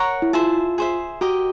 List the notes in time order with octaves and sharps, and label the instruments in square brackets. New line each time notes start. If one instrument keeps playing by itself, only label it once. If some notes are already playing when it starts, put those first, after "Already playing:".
Already playing: [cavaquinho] A#4 C#5 F#5 A#5
[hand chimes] E4
[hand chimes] F4 [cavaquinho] G#4 C5 E5 A5
[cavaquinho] G#4 C5 E5
[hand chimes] F#4 [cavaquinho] G4 A#4 D#5